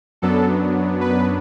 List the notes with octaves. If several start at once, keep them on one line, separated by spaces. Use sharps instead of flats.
F#2 F#3 B3 D4 A4
B4